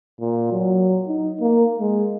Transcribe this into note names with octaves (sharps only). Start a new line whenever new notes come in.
A#2
F#3
D#4
A#3
G#3